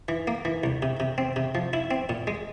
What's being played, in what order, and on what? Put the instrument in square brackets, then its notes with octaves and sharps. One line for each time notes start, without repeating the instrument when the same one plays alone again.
[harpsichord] E3
A#3
E3
C2
C3
C3
C4
C3
F3
E4
C4
A#2
G#3